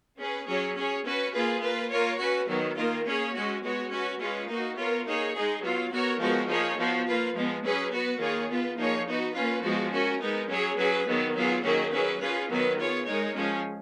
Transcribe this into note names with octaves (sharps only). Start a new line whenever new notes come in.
C#4 G#4 B4
F#3 C#4 G#4 C#5
C#4 G#4 C#5
C#4 F#4 B4
A#3 F4 G#4 B4
A#3 F4 B4
A#3 F4 A#4 C#5
C#4 F#4 B4
D#3 F#3 B3
D#3 A#3 F4 A#4
A#3 C#4 G#4 C#5
G#3 C#4 F#4
G#3 B3 F#4 C#5
C#4 F#4 B4
G#3 C#4 F4 B4
A#3 D#4 F#4
B3 F4 A#4 C#5
A#3 D#4 G#4 C#5
G#3 D#4 G#4
F#3 B3 F4
B3 F#4 A#4 C#5
F3 G#3 B3 F#4 A#4
F3 A#3 D#4 G#4 C#5
F3 B3 F#4
A#3 F4 B4
F3 G#3 B3
F#3 C#4 G#4 B4
B3 F#4 B4
D#3 A#3 F4 G#4 C#5
B3 F4 B4
F3 A#3 D#4 G#4 C#5
B3 D#4 F#4 B4
A#3 C#4 F4 B4
F3 G#3 B3 F#4
C#4 F#4 A#4
G#3 B3 D#4 A#4
F#3 C#4 G#4 C#5
F#3 C#4 G#4 B4
D#3 F#3 B3
F#3 B3 F4 G#4
D#3 F#3 A#3 C#4 G#4
F#3 C#4 G#4 B4
C#4 F4 G#4 B4
D#3 F#3 B3 F#4 B4
B3 F4 G#4 C#5
G#3 D#4 A#4 C#5
F3 G#3 C#4